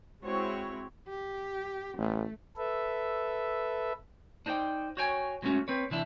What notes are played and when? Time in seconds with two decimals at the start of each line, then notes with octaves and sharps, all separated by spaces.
0.24 G#3 C4 E4 F#4 C#5
1.09 G4
1.98 A1 A3
2.57 A4 B4 E5
4.46 D4 D#4 C5 D5 G5
4.97 F#4 C5 C#5 G5 G#5
5.42 F#3 G#3 A3 C4 C#4 F#4
5.68 C4 B4 C#5
5.90 C3 E3 D4 E4